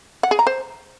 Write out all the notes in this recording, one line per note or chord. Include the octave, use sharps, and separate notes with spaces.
F#5
G#4
A#5
C5